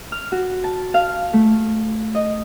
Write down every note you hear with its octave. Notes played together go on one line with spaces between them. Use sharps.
F6
F#4
A5
F5
A3
D#5